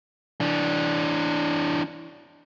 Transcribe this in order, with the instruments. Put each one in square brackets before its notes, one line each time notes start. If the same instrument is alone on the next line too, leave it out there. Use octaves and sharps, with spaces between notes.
[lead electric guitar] E3 D4